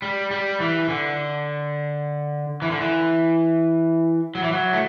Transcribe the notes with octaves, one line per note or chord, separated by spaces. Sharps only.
G3
G3
E3
D3
E3
D3
E3
F#3
E3
F#3
A3